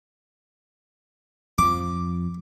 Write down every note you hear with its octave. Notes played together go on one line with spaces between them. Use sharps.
F2 F3 D6